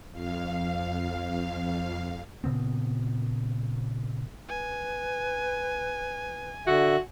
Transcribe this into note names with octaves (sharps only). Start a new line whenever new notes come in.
F2 F5
A#2 C#3 B3 C4
B4 G#5
D3 F#4 E5